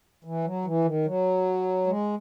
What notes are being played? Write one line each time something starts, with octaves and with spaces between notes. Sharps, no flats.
E3
F#3
E3
D#3
F#3
G#3